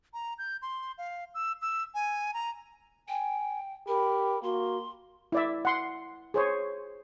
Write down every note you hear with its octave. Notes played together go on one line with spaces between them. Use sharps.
A#5
G6
C6
F5
E6
E6
G#5
A#5
G5 G#5
G4 A#4 B5
A#3 F#4 C6
E4 D5 E5
F#5 C6
G#4 C5 C#5